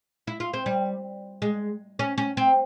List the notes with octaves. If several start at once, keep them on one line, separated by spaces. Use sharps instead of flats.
E4
F4
C4
G3
G#3
C#4
C#4
C4